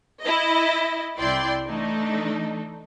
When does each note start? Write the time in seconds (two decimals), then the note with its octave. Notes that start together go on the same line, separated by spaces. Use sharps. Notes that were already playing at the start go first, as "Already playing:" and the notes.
0.21 E4 D#5
1.18 C2 E4 D5 G5 C6
1.67 E3 A3 D4 D#4